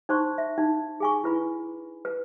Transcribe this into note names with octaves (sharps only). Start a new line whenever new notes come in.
D#4 C5 C6 C#6
E5
D#4
G#4 G#5 C#6
E4 B4 B5
B4